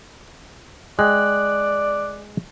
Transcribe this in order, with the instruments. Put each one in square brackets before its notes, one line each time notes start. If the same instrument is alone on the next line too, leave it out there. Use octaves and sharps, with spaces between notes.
[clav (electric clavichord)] G#3 G5 [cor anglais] D5 [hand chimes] F#6